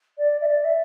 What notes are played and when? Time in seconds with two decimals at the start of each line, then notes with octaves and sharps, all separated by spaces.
0.18 D5
0.41 E5
0.46 D5
0.64 E5